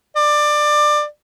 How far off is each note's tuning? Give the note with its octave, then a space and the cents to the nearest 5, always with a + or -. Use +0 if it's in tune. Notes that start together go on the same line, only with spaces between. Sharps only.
D5 +20